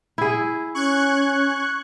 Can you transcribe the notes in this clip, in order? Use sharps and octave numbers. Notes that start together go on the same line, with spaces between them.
E4 G#4
C#4 C#6 F#6 G#6